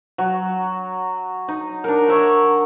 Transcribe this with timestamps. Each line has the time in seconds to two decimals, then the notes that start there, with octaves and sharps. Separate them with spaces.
0.18 F#3
1.48 D#4
1.84 D4 A#4
2.08 C#5 E5 F#5